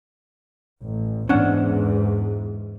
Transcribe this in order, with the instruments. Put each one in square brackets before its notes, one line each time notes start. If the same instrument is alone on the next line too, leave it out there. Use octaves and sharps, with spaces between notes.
[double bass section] A1
[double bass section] E2 G#2 [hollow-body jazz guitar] C#4 D4 F#5